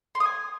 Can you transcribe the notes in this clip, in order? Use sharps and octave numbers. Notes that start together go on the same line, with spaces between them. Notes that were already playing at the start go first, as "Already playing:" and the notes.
C6
D#6
G#5